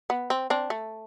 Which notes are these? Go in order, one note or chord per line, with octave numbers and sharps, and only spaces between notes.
B3
C4
C4 D4
A3